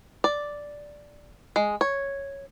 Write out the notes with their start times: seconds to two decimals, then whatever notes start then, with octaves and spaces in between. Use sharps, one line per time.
0.24 D5
1.56 G#3
1.81 C#5